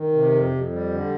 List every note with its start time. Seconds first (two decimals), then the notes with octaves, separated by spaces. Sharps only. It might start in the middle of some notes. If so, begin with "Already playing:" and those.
Already playing: D#3
0.13 C3
0.31 F2
0.51 F2
0.70 G3
0.90 D3